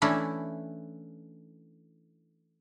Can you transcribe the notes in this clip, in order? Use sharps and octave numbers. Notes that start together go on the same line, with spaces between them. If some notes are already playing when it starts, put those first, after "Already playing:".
E3 A3 C#4 D4 E4